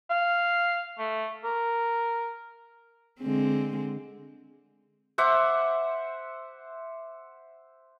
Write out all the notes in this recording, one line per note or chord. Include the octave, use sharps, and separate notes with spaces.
F5
A3
A#4
D3 G#3 C4
C5 E5 F#5 D6